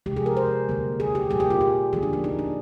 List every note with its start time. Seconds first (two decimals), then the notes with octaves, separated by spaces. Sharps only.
0.06 C3 F3 G#3 G4
0.17 G#4
0.26 A#4
0.37 C5
0.69 D3 G3 A#3
1.00 G#4
1.15 G4
1.30 A#2 G3 A#3 G#4
1.40 G4
1.50 F4
1.61 G4
1.93 D3 F3 A#3 G#4
2.03 D4
2.13 D4
2.24 D#4
2.39 D4